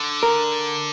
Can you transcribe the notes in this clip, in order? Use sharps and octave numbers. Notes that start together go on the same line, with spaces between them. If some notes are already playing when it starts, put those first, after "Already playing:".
Already playing: D3
A#4